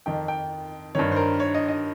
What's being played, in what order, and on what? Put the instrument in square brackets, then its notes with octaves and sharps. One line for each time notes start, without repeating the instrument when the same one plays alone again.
[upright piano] F2 D#3 G5
G5
G2 D#3 C#5
C5
A#4
C#5
D#5
D#5